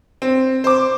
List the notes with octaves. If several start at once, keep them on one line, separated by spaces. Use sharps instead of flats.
C4
C5 D6